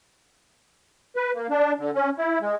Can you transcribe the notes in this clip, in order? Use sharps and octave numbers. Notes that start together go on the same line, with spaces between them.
B4
A#3
D4
D3
C#4
E4
G#3